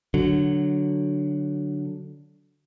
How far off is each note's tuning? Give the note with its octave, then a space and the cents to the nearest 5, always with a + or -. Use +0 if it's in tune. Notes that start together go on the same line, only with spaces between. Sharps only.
D3 +0 F#3 +5